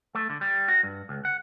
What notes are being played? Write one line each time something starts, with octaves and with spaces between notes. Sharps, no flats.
A3
D3
G3
F#4
G2
C#2
F#5